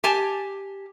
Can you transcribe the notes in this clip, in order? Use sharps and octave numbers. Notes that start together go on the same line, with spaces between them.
G4 G#5 A5